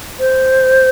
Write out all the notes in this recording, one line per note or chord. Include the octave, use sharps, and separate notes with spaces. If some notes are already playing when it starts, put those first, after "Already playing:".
C5